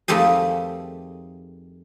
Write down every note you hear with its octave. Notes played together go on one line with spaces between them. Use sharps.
F2 D#3 F3 A3 G4 G#4